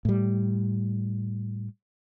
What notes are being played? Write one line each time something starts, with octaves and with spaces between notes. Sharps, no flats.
A2 G3